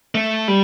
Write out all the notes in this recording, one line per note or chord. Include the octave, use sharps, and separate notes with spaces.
A3
G3